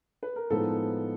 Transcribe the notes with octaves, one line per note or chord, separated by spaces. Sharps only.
B4
A#4
A2 F3 G#3 B3 D#4 A4